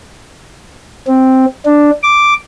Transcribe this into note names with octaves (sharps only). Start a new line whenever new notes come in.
C4
D4
D6